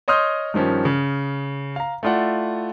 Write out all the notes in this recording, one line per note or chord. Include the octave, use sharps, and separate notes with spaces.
C#5 D#5 C6 D#6 F6 G6
G2 D#3 F3 C#4
C#3
F5 A#5
A3 E4 F4 D5 F#5